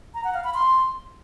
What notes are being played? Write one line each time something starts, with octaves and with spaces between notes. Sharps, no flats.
A#5
F#5
F5
B5
C6